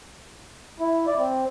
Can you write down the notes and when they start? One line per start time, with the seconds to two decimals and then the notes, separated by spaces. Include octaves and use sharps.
0.80 E4
1.07 D5
1.18 C4